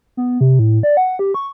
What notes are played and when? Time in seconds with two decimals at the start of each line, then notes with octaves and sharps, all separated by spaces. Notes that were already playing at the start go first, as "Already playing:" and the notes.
0.17 B3
0.41 C3
0.59 A2
0.83 D5
0.97 F#5
1.19 G4
1.34 C#6